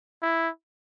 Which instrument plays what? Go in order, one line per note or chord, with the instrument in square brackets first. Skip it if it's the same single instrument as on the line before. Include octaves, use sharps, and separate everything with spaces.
[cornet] E4